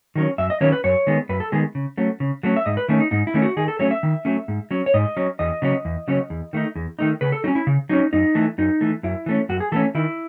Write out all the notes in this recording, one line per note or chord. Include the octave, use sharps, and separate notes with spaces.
D#3 F#3 C#4
F#2 E5
D#5
D#3 F#3 C#4 C#5
B4
F#2 C#5
D#3 G#3 B3
F#2 B4
A4
D#3 G#3 B3 G#4
C#3
F#3 A3 C#4
C#3
F#3 A3 C#4
E5
G#2 D#5
B4
D#3 A3 C#4
D#4
G#2 D#4
E4
D#3 A3 C#4
F#4
D#3 G#4
A4
F#3 A3 C#4 C#5
E5
D#3
F#3 A3 C#4
G#2
F#3 C#4
C#5
G#2 D#5
F#3 C#4
E2 D#5
C#3 F#3 C#4
E2
C#3 F#3 C#4
E2
D#3 A3 D#4
E2
D#3 A3 D#4
C#3 B4
A4
F#3 C#4 D#4
E4
C#3
F#3 C#4 D#4
F#2 D#4
E3 A3
F#2 D#4
E3 A3
F#2 E4
E3 A3 C#4
F#2 F#4
G#4
E3 A3 C#4 A4
D#3 E4